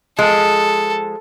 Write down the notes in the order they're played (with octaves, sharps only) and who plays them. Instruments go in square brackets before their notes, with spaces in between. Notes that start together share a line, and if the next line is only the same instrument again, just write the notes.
[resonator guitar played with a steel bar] F3 G#3 [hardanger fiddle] A4